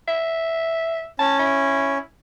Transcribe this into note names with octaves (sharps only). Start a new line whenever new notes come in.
E5
C#4 A5
E4